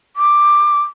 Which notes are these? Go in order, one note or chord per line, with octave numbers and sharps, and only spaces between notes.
D6